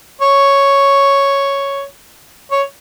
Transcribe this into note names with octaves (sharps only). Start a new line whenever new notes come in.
C#5
C#5